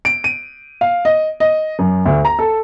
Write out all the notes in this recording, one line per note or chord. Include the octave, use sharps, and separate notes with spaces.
D7
D#7
F5
D#5
D#5
F#2
D2
A#5
A4